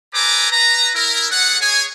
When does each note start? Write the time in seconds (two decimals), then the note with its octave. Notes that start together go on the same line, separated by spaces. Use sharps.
0.14 A4 B4 C5 G#5 A#5 D6
0.51 B4 A#5
0.95 E4 A#4
1.31 A3 G#4 C#5 F#5
1.61 G#4 C#5 G#5